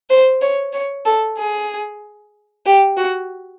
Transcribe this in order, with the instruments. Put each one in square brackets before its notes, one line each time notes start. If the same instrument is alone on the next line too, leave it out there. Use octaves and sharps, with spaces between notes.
[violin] C5
C#5
C#5
A4
G#4
G4
F#4